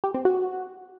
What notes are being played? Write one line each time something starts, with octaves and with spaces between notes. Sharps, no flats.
G4
C4
F#4